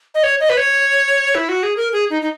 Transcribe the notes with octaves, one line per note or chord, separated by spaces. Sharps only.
D#5
C#5
D#5
B4
C#5
E4
F#4
G#4
A#4
G#4
D#4
D#4